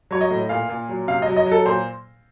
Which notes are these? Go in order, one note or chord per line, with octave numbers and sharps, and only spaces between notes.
F#3 C#5
D#5
A2
A#2 F5
A#2
F#3
C3 F5
F#3 D#5
D#5
F#3
A4
A#2 C5